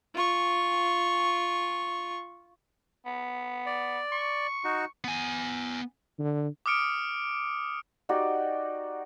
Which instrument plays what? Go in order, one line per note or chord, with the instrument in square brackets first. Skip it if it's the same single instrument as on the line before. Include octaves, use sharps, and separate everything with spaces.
[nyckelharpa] F4 C#6
[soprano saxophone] B3
[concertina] D5
[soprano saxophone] C#6
[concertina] D#4 F#4
[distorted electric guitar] B3 G#5
[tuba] D3
[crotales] D6 D#6 F6 C#7 D7
[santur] D#4 F#4 G4 D5